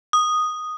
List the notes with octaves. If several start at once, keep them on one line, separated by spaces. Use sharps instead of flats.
D#6